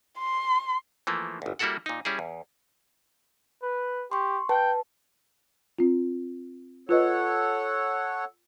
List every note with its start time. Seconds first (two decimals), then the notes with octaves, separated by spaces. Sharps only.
0.19 C6
1.07 E3 F3 A3 A#3
1.42 G1 D2
1.59 G3 A#3 E4 F#4 A4 F#5
1.86 A#2 D#4
2.05 G3 C#4 E4 G#4
2.19 E2
3.63 B4
4.11 G4 C6 C#6
4.49 B4 G5 A5
5.79 C4 F4
6.89 F4 A4 B4 C#5 D#5 F#5